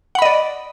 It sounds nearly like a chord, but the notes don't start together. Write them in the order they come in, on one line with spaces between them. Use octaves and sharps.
F#5 B5 D#5 D5